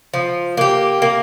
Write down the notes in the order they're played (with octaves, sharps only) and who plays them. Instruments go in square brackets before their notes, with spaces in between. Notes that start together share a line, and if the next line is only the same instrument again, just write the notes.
[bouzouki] F3
A#3 G4
A#3